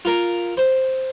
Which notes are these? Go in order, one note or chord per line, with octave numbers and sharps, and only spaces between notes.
F4 A#4
C5